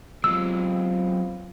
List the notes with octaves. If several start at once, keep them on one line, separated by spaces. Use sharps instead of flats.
F#3 G#3 B3 C4 F4 E6